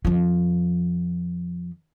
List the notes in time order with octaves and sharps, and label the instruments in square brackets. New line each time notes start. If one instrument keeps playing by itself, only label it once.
[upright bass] F2 F3